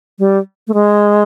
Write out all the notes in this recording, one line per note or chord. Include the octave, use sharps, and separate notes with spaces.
G3
A3
G#3